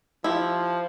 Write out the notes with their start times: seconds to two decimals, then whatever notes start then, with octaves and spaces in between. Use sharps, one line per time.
0.24 F3 E4 G4